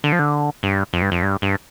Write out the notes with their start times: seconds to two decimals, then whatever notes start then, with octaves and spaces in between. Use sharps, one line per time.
0.04 D3
0.12 F3
0.19 D3
0.63 G2
0.93 F2
1.02 G2
1.12 F2
1.23 G2
1.42 G2